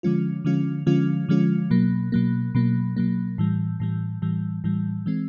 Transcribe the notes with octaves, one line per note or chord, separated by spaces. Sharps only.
D3 F3 G#3 C#4 F4
D3 F3 G#3 C#4 F4
D3 F3 G#3 C#4 F4
D3 F3 G#3 C#4 F4
B2 F#3 A#3
B2 F#3 A#3
B2 F#3 A#3
B2 F#3 A#3
A2 E3 G3
A2 E3 G3
A2 E3 G3
A2 E3 G3
E3 G#3 C4